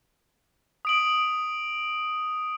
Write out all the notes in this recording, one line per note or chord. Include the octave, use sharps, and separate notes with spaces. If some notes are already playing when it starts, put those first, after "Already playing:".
D#6 D7 F#7